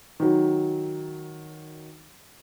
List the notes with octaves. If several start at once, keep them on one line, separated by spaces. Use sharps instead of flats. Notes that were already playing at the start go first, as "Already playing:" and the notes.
D#3 F#3